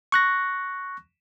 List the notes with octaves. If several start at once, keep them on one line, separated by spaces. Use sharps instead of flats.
C#6 F#6 A#6